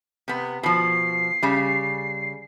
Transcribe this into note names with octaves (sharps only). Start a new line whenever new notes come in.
C3 B3
B2 F3 C7
C#3 G3